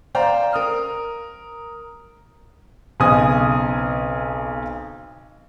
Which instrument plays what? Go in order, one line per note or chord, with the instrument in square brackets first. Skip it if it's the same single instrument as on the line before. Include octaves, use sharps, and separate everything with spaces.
[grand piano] C5 D5 F5 G5 A#5
A#4 D#6 F6
B1 C#3 C4 D#5 G#5 D#6